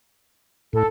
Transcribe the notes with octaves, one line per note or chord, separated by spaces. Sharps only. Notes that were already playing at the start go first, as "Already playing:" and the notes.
A2 A4